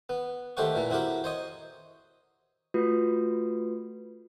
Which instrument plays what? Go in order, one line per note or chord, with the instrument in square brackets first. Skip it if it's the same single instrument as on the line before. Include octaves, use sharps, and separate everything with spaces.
[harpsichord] B3
D#2 A3 G4 C5 F#5 C#6
A#2 E3 A#3
C4 E4 F#4 G4 A#4
C5 C#5 D#5
[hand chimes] A3 F4 F#4 B4